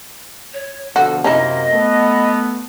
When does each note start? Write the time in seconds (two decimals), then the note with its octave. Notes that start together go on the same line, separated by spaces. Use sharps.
0.53 C#5
0.96 B2 D3 F3 F#4 A4
1.24 F#2 C3 A#3 C#4 D#4 E4 D#5
1.72 A3 B3